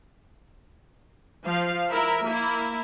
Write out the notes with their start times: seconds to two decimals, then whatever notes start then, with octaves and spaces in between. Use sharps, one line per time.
1.44 F3 F5
1.90 E4 A#4 E5
2.27 A#3 E4